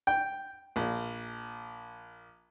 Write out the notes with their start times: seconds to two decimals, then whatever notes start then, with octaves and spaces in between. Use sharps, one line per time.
0.07 G5
0.76 A#1